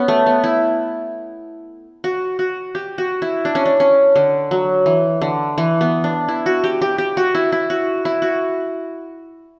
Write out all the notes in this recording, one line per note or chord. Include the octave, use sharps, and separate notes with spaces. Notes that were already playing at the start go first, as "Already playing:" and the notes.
Already playing: B3 C#4
A3
B3
E4
F#4
F#4
G4
F#4
E4
D4
C#4
D4
C#4
D3
F#3
E3
D3
E3
B3
D4
E4
F#4
G4
G4
G4
F#4
E4
E4
F#4
E4
F#4